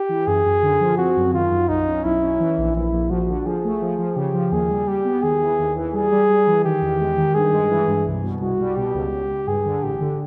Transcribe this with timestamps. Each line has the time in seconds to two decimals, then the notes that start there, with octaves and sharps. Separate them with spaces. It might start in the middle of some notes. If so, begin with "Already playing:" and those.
Already playing: G4
0.09 E3
0.27 F#2 G#4
0.45 F#2
0.63 D3
0.80 F3
0.98 C4 F#4
1.16 F#2
1.34 D#3 F4
1.51 F#2
1.69 B1 D#4
1.87 C#4
2.04 B1 E4
2.22 C#4
2.40 E3
2.58 A#1
2.76 A#1 E4
2.92 A#1
3.10 F3 F#4
3.28 D3
3.46 F3 G#4
3.64 A3
3.82 F3
3.98 F3
4.16 C#3 G4
4.34 F3
4.51 D#2 G#4
4.70 G3
4.87 G3 G4
5.04 B3
5.22 D#2 G#4
5.41 E3
5.59 D#2
5.76 E3
5.93 G3 G#4
6.12 G3
6.29 G3
6.47 E3
6.65 D#3 G4
6.82 E2
7.00 G#3
7.17 D#3
7.35 G2 G#4
7.53 G#3
7.70 E3
7.88 G2
8.06 C2
8.23 B2
8.41 C2 F#4
8.60 G3
8.76 B2 G4
8.94 C#2
9.12 C#2
9.30 C#2
9.47 G2 G#4
9.65 D3
9.82 A1 G4
10.01 D3